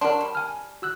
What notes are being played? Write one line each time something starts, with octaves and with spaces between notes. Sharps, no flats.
F#3 D4 A#4 C6
G3
G#5 F6
F#4 E6 F#6